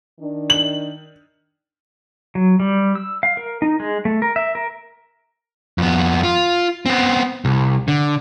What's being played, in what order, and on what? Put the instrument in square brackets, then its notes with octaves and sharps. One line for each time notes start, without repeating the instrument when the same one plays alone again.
[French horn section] D#3 D4
[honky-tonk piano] F#7
[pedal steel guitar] F#3
G3
E6
F5
A#4
D#4
G#3
A3
A#4
E5
A#4
[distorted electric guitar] F2 B3
F4
B3 C4
C2
D3